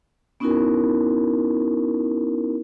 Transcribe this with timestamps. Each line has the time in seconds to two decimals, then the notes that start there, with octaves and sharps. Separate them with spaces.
0.40 B3 C#4 D#4 E4 F#4 A#4